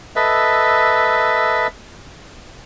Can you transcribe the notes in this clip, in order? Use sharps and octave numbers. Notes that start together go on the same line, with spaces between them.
A4 B4 D#5 E5